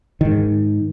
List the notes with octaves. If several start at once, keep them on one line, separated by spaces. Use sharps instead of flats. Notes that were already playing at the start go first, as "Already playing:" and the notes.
G#2 D#3